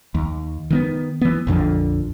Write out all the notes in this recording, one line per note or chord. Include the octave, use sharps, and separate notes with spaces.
D#2
D#3 A#3 B3
E3 B3
A#1 F2 D3 F3